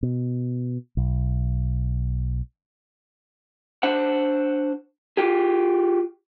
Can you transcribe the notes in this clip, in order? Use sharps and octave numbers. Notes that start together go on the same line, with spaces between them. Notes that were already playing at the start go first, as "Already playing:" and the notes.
B2
B1
D4 C5 F#5
F4 G4 G#4